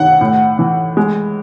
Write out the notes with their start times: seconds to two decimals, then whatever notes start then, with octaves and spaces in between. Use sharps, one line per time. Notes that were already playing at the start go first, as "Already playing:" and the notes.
Already playing: D#3 F#5
0.21 A2
0.59 E3
0.97 G#3